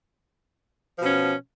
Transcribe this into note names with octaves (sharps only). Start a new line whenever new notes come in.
B2 F3 C#4